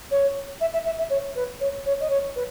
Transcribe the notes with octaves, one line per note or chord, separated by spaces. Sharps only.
C#5
E5
E5
E5
E5
C#5
B4
C#5
C#5
D#5
C#5
B4